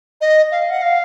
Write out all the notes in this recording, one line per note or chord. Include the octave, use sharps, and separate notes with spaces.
D#5
F5
F#5
F5